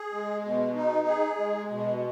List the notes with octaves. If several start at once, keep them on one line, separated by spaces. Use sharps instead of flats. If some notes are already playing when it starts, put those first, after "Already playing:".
Already playing: G#4
G#3
B2
D#4
G#4
G#3
B2